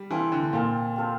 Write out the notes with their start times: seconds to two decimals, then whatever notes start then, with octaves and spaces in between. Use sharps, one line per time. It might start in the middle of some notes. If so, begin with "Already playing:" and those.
Already playing: G3
0.10 E3 C4 F4 A4 C5
0.32 D3
0.53 A#2 C4 F4 A4 C5
0.96 C4 F4 A4 C5